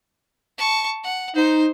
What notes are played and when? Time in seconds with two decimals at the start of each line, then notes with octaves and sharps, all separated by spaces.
0.58 A5 C#6
1.04 F#5
1.36 D#4 C5